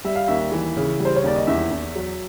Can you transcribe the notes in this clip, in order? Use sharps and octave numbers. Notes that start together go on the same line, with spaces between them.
G3 E5
F5
D#2 E5
E3
C#3
G3
C5
C#5
D#2 D5
D#5
E2 E5
E2
F#3